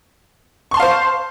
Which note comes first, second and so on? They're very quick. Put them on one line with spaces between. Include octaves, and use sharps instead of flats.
C#6 C6 A5 F5 C5